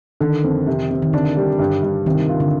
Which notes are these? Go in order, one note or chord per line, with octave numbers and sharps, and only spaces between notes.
D3 D#3
F2
C3
C3
D#3
D3 D4
G3
G2
G2
C3 D#3
F4
D3